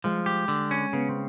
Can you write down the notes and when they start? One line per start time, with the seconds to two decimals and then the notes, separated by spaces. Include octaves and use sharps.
0.04 F3 G#3
0.26 G4
0.48 D3
0.71 C#4
0.93 C#3 B3
1.09 C4